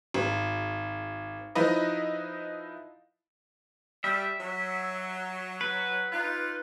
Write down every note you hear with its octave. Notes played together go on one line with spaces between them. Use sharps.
G#1
F3 D#4 E4 B4 D#5
G3 E5
F#3
B4
D#4 F4